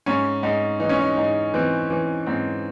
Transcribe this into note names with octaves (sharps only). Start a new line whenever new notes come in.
G#2 C#4
G#2 D#4
E3 D#4
C#4
D#4
G#2 D#4
E3 C4
E3
G#2 C4